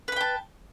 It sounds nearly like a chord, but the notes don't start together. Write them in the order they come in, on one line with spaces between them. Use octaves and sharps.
B4 B5 G5 A5